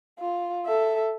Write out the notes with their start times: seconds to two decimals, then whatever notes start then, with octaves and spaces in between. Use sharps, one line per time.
0.20 F4
0.66 A4 E5